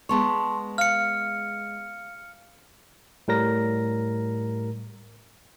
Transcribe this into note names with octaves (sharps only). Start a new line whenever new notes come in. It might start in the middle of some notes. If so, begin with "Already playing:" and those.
G#3 B3 C#5 A5 C6 C#6
F5 F6 C#7
A2 G3 A#4 A#6